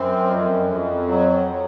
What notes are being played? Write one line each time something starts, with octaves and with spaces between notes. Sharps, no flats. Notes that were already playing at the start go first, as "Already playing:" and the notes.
Already playing: F#2 C4
F2
F2
F#3
F#3